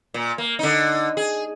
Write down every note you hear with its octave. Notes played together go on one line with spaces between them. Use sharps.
A#2
A#3
D3 D#4
G#4